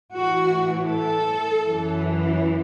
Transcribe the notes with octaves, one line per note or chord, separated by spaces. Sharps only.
A2 E3 F#4
A4
F#2 E3